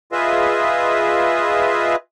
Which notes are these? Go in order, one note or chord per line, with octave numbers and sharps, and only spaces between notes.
F4 G#4 B4 D#5 E5